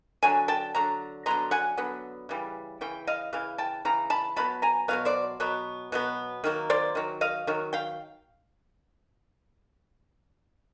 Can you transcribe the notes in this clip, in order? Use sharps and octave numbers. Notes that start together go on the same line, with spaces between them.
D3 F#3 G#5
G5 A5
D3 F#3 A#5
D3 F#3 B3 A#5 C6
F#5 G#5
D3 F#3 B3
C#3 E3 G3
C#3 E3 G5
D#5 F5
C#3 E3 F5
G5 A5
C#3 E3 A#5
A5 B5
B2 F#3 B3 A5 B5
G#5 A#5
B2 F#3 B3 F5
C5 D5
B2 F#3 B3
B2 F#3 B3
D#3 F#3 A#3
C5 D5
D#3 F#3
D#5 F5
D#3 F#3
F5 G5